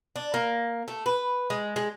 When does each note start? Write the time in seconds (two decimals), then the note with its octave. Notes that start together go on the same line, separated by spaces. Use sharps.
0.16 D4
0.34 A#3
0.88 A3
1.06 B4
1.50 G#3
1.76 G#3